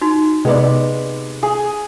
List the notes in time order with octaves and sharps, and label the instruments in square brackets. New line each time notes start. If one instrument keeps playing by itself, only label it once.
[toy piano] D#4 F#4
[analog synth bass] C3 [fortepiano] G#3 B3 D5
[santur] G#4